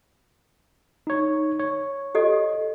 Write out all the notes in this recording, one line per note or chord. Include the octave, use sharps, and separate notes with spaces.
D#4 C#5
C#5
G4 A4 D#5